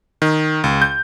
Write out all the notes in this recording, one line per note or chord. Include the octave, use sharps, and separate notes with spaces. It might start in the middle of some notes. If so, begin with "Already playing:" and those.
D#3
C#2
G6